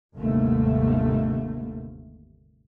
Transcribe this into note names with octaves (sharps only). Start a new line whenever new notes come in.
G1 D#2 G#2 C3 A3 A#3